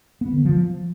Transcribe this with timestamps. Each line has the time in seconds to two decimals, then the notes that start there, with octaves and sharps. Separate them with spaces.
0.21 B3
0.33 D3
0.45 F3